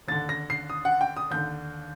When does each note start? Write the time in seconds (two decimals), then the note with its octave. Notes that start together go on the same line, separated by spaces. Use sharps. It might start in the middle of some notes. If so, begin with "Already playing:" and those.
0.08 D#2 D3 A6
0.29 A#6
0.50 C7
0.69 D#6
0.85 F#5
1.01 G5
1.17 D#6
1.31 D#2 D3 G6